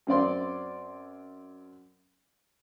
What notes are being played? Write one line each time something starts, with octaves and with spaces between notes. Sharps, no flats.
F#2 C4 D5 C6